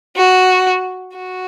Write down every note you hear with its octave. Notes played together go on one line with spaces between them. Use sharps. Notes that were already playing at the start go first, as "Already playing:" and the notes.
F#4
F#4